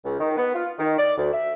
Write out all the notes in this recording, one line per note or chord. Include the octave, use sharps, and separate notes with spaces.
C#2
D#3
B3
F4
D#3
D5
D2
E5